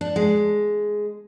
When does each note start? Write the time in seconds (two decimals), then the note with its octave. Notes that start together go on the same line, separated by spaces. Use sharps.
0.01 D4
0.16 G#3